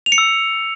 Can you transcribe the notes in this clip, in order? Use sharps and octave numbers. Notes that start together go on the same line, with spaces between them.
F7
C#7
E6